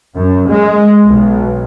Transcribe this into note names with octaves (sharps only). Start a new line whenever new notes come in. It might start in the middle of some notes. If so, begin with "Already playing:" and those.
F#2
G#3
B1